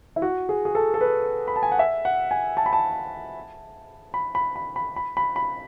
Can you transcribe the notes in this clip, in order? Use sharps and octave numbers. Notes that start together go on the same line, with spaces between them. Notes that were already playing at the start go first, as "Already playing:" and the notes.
E4
F#4
G#4
G#4
A4
A4
B4
B5
A5
G#5
F#5
E5
F#5
G#5
A5
B5
A5
B5
B5
B5
B5
B5
B5
B5